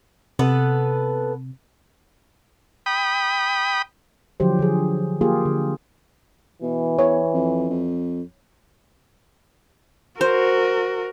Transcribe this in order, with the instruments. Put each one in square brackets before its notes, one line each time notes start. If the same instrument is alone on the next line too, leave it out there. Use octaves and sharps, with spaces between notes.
[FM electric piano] C3 [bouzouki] B3 A4 B4
[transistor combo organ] G5 B5 D#6
[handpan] D3 F3 F#3 G4 C5
D3 F3 G#4
A#3 F4 G4 G#4
D3
[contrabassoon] B2 [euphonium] E3
[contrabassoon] E2 [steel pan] C#5
[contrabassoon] F2
F2
[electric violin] F#4 A#4 [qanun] C5